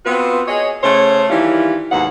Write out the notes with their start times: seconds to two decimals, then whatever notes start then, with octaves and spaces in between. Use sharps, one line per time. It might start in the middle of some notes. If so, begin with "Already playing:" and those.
0.06 B3 C4 F4 F#4 B4
0.48 G#4 C#5 D#5
0.83 C#3 A3 C5 C#5
1.30 D#3 E3 G3 C#4 E4 F4
1.92 D#2 G#2 F#3 B3 F#5